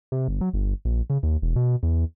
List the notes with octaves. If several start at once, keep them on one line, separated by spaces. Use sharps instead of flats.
C3
G1
F#3
G1
A#1
C#3
D#2
E1
B2
E2